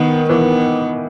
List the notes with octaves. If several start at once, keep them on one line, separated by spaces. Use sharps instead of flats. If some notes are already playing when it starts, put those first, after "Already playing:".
Already playing: D#3 B3
E3 B3